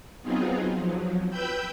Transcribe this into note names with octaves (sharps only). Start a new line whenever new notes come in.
F#3 B3 C4 D#4 F4 G#4
F3 F#3
B4 G5 B5 E6 G6